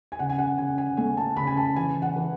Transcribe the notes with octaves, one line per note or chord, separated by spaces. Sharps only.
G#5
C#3 F#5
G#5
F#5
C#3 G#5
G#5
A3 G#5
A5
C#3 B5
G#5
A5
E3 G#5
F#5
E3